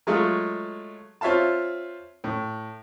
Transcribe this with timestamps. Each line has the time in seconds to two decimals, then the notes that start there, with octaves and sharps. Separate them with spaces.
0.07 F#3 G#3 A3 F4
1.21 C4 F4 C#5 E5 F5 A5
2.24 A2